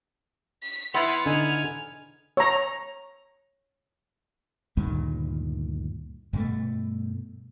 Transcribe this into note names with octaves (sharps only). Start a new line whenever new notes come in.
B6
B3 E4 C6 F6
D3 D#4 G#5
C#5 A#5
D2 G2 A#2 D#3
G2 B2 A3